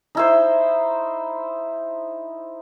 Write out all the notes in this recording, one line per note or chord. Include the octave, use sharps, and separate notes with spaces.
D#4 E4 C5